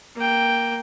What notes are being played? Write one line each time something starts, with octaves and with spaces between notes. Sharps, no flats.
A#3 G5